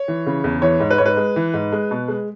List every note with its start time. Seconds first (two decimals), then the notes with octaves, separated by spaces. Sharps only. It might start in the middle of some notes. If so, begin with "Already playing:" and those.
Already playing: C#5
0.08 E3
0.26 C#3
0.44 E2
0.62 E3 C#5
0.80 G#2
0.90 B4
0.98 G#2 C#5
1.05 B4
1.17 G#3
1.36 E3
1.54 G#2
1.72 G#3
1.91 B2
2.08 G#3